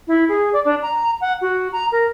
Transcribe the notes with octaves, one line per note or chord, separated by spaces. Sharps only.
E4
G#4
D5
D4
A#5
F#5
F#4
A#5
A#4